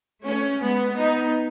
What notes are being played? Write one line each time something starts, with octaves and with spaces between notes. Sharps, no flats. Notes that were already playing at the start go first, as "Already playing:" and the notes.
A3 C#4
G#3 B3
B3 D#4